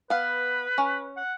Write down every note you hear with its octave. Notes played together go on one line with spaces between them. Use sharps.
B3 B4 F5
C#4
F#5